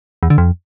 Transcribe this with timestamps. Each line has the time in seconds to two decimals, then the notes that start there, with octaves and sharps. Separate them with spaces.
0.23 E2
0.30 D3
0.38 F2